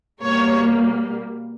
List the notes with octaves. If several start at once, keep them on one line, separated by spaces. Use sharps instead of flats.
B2 G3 A#3 C#5